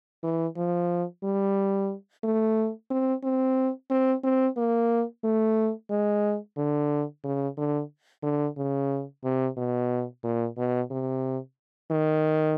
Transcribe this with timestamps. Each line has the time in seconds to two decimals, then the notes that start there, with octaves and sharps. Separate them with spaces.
0.23 E3
0.57 F3
1.24 G3
2.24 A3
2.91 C4
3.23 C4
3.90 C4
4.24 C4
4.57 A#3
5.24 A3
5.90 G#3
6.57 D3
7.24 C#3
7.57 D3
8.23 D3
8.57 C#3
9.24 C3
9.57 B2
10.24 A#2
10.58 B2
10.91 C3
11.91 D#3